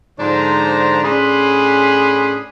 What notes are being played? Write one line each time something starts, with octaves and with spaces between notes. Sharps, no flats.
G#2 D3 F3 D4 C5 A#5
A2 C#4 D4 G#4 B5 C6